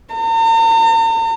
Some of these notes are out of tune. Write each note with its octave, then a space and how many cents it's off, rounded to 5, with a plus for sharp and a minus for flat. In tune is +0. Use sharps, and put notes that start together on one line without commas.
A#5 -45